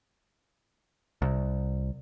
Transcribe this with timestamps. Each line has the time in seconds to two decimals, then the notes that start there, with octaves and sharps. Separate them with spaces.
1.22 C2